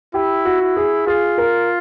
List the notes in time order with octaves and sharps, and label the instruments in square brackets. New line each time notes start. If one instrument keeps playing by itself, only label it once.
[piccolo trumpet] E4 [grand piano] G4
[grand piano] F#4
[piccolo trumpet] E4
[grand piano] G#4
[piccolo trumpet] F4 [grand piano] G#4
[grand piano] A#4